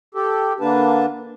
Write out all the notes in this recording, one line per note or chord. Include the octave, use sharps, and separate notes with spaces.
G4 A4
D3 A#3 D4 B4 A5